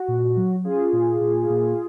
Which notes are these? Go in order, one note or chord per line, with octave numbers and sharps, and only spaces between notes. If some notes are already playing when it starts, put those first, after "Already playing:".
Already playing: F#4
A#2
F#3
C#4 F4 G#4
A#2
A#2
A#2